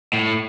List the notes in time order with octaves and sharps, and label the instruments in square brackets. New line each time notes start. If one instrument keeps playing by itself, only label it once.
[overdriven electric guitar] A2